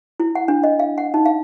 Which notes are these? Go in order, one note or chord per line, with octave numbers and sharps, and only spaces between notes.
E4
F#5
D4
D#5
F5
F#5
D#4
F5